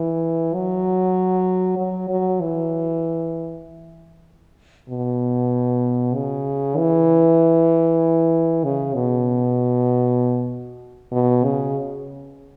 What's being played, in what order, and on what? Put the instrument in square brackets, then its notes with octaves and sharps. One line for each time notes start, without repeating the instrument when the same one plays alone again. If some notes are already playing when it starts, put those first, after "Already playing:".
Already playing: [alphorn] E3
F#3
F#3
F#3
E3
B2
C#3
E3
C#3
B2
B2
C#3